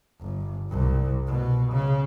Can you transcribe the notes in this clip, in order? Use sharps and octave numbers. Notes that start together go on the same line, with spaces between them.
G1
C2
B2
C#3